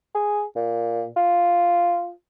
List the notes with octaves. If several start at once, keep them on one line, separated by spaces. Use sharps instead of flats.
G#4
A#2
F4